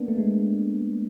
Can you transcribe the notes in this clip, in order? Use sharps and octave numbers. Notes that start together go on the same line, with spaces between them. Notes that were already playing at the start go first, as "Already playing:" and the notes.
Already playing: A#3 B3 D4
A3
G#3